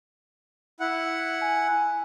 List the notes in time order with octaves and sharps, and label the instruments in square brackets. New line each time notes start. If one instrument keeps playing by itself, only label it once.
[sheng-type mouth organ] E4 F#5
[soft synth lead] G#5